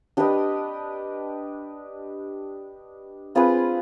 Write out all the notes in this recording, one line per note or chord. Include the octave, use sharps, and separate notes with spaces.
D4 G4 B4 D#5
C4 F4 G#4 B4